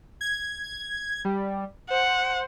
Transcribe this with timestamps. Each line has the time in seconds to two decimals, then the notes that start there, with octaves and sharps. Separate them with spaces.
0.21 G#6
1.25 G3
1.90 C5 F#5